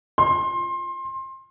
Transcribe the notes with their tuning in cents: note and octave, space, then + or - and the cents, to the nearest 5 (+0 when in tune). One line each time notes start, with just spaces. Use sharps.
C6 +25